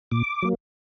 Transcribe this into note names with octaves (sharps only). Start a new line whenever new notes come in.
A#2 D6
F#3 A#3